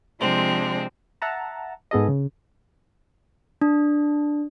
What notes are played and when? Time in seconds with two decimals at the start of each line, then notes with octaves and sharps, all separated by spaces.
0.21 C3 F3 G#3 C4 D4
1.22 E5 F#5 A5 A#5
1.91 G#2 B3 G#4 A4 D#5
2.09 C#3
3.62 D4